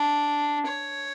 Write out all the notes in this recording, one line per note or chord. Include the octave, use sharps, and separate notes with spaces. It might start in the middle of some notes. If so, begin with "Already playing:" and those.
Already playing: D4
C#5